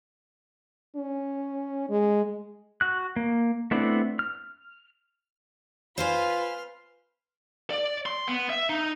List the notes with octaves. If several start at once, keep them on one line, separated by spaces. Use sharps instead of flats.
C#4
G#3
F#4 F#6
A#3
A3 B3 C4 D4 E4
F6
F4 B4 C5 F5 G#5 C6 F6
D5
C6
B3
E5
D#4